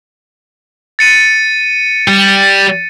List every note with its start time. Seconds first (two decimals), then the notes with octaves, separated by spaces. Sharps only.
0.99 A6 C#7 D#7
2.08 G3